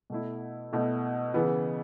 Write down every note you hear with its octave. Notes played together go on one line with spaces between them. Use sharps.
B2 A3 E4
B2 A3 E4
C#3 E3 B3